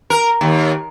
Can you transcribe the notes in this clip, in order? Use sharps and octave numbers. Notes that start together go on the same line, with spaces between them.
A#4
D#2